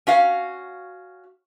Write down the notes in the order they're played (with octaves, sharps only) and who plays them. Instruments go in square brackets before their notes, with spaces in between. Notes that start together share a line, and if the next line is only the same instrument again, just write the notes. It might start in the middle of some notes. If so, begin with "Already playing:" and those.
[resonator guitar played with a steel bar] C#4 F#4 F5